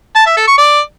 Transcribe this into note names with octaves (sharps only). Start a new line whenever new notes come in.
A5
E5
A4
C#6
D5